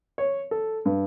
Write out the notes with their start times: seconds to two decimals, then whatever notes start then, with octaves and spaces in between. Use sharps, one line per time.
0.18 C#5
0.51 A4
0.85 G2